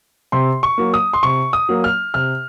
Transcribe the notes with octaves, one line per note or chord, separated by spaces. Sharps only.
C3 C6
C#6
F#3 A#3
D#6
C6
C3 C#6
D#6
F#3 A#3
F6
C3 F6